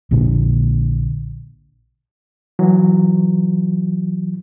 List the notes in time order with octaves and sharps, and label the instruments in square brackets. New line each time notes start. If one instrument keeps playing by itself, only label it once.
[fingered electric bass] A#1 A#2 D3
[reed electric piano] E3 F#3